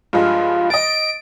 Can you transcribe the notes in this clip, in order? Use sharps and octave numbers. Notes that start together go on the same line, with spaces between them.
G2 F3 G#3 F4
D#5 A6 D7